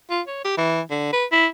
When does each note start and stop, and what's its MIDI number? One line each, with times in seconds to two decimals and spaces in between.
0.10 0.21 65
0.27 0.42 73
0.45 0.53 67
0.57 0.81 52
0.91 1.11 50
1.13 1.26 71
1.32 1.47 64